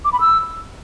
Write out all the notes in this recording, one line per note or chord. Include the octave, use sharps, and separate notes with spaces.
D6
B5
E6